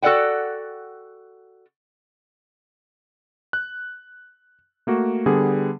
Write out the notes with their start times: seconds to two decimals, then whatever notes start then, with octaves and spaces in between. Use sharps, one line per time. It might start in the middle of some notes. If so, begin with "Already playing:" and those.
0.02 F#4 A4 A#4 D5 F#5 G5
3.53 F#6
4.87 A3 A#3 F#4
5.26 D3 G3 B3 G#4